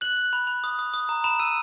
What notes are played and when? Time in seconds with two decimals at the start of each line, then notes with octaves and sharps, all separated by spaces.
0.01 F#6 F#7
0.17 F#6
0.33 B5
0.47 B5
0.64 D#6
0.79 D#6
0.94 D#6
1.09 A#5
1.24 B5 E7
1.39 E6 D#7